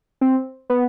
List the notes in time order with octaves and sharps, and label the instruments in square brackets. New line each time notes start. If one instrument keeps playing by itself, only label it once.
[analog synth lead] C4
B3